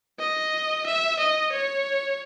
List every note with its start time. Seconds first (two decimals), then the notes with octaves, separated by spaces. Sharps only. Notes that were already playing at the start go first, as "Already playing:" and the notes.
0.19 D#5
0.86 E5
1.19 D#5
1.52 C#5